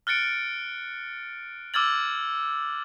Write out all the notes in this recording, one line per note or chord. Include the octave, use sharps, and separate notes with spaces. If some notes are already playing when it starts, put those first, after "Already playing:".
F6 F#6 A6 C#7 D7
D6 E6 F6 G#6 A6 F#7